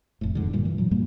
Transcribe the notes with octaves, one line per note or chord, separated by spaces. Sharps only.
F1 A2
F2 G#2 D3
G2 A#2 G3
E3
A#2 F#3
G2 B2 G3 A#3